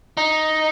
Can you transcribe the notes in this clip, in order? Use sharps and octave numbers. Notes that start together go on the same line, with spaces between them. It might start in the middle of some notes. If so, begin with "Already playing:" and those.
D#4